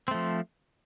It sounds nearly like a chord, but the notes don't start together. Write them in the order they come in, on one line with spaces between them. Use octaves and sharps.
C4 A3 F3